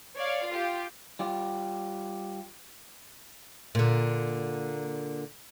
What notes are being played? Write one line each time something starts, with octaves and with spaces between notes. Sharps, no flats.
C#5 D5 F5
F4 G4
G3 F4 G4
A#2 D3